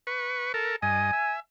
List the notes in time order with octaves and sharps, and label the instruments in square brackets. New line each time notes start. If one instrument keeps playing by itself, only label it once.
[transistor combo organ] B4 C#6
A4 A#4
[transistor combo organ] G2 D#5 [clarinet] G#5
[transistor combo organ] E5